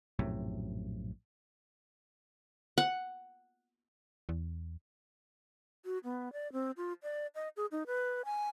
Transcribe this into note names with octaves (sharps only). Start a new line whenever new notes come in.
A#1 F#2 A2 C3
F#5
E2
F#4
B3
D5
C4
F4
D5
D#5
G#4
D#4
B4
G#5